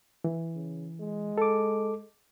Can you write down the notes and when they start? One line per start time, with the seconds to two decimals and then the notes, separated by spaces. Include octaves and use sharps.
0.24 E3
0.55 C#3
1.00 G#3
1.38 A4 D6